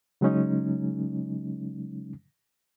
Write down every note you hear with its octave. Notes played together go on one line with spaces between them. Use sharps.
C#3 F#3 G#3 C#4 D#4